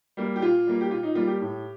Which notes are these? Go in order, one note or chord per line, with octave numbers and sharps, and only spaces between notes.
G3 A#3
G4
A#2 F4
G3 A#3
G4
A#2 F4
D#4
G3 A#3 F4
G4
A2